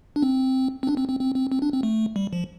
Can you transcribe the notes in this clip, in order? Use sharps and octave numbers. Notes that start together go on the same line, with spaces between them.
D4
C4
C4
D4
C4
C4
C4
C4
C4
D4
C4
A3
G3
F3